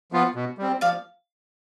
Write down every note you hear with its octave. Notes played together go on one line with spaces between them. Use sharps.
F3 B3 F4
B2
G3 C4
F3 D5 F5